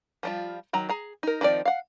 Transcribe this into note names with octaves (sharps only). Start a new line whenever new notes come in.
F3 G3 F4
D#3 F#3 A#5
G#4 A#5
D#4 A#4
D#3 F3 C4 D5
F5 F#5